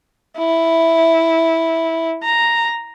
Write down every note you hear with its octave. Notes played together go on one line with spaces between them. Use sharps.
E4
A#5